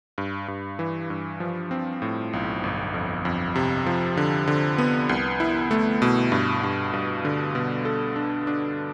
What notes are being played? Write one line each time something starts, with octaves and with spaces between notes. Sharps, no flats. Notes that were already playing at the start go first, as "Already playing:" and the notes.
G2
G2
E3
G2
F3
C4
A2
B1
G1
F2
F2
C3
F3
D3
D3
B3
C2
E4
A3
B2
G2
G2
G2
D3
B2
A4
D4
D4